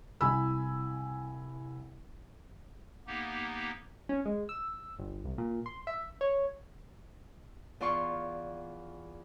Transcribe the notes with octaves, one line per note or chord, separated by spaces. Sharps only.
C2 E4 G#5 B5 E6
A#3 B3 D#4 G4
C#4
G#3
E6
G1
C2
A#2
C6
E5
C#5
E2 F4 D5 C6 C#6